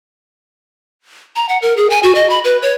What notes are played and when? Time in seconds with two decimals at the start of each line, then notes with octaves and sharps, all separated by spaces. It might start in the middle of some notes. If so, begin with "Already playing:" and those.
1.36 A#5
1.49 F#5
1.62 A#4
1.77 G#4
1.90 G#5
2.03 F#4
2.15 D#5
2.30 B5
2.44 B4
2.62 C#5